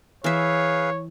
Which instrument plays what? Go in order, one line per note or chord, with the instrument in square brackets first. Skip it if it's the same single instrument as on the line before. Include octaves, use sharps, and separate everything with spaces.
[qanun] E3 E5 [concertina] G#4 B4 F5 [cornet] C#5